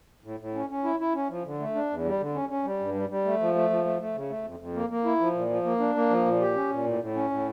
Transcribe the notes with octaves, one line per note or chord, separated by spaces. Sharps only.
A2
A2
C#4
C#4
E4
E4
C#4
F3
D3
A3
D4
E2
G3
D3
C#4
C#4
G3
G2
G3
G3
A3
F3
A3
F3
A3
A3
C#3
A3
F2
F2
A#3
A#3
E4
F3
A#2
F3
A#3
D4
A#3
F3
A#2
G4
C#4
A#2
A2
A2
C#4
A2